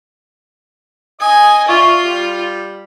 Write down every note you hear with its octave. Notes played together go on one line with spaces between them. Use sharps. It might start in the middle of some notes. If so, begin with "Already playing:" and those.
D#5 G#5 D#6
F4 D5 E5 C#6
G3